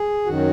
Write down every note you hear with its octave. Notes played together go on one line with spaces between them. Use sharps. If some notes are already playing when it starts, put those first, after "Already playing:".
Already playing: G#4
F#2 D#3 F#4